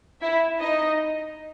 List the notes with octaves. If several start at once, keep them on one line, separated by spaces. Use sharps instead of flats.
E4 E5
D#4 D#5